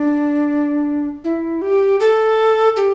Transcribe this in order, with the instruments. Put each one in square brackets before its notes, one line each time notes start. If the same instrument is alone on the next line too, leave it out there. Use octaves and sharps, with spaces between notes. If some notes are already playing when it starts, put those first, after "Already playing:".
Already playing: [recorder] D4
E4
G4
A4
G4